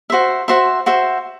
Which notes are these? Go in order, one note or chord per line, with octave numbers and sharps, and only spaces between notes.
F#4 C5 E5
F#4 C5 E5
F#4 C5 E5